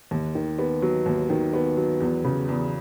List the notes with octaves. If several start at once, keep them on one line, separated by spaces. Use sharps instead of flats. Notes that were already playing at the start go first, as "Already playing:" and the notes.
D#2
D#3
B3
F#3
D#2
D#3
B3
F#3
E2
C#3
E2